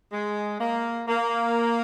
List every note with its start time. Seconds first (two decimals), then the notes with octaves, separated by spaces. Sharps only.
0.12 G#3
0.59 A#3
1.08 A#3